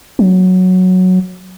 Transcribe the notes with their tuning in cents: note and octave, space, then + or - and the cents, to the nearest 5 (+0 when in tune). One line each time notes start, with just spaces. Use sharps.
F#3 -5